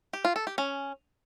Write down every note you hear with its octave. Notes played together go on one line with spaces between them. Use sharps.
G4
F4
A4
G4
C#4